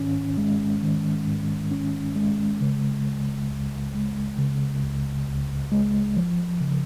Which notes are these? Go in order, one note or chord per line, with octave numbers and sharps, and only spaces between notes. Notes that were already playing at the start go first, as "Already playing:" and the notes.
Already playing: G#2 D#3 C#4
G#3
D#3
G#2
C#4
G#3
C#3
C#2
C#2
G#3
C#3
C#2
C#2
G#3
F3
C#3